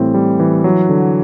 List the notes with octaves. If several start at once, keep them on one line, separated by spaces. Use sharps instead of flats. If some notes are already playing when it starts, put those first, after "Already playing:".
Already playing: A2 E3 G3 C4
G3
E3
F#3
D3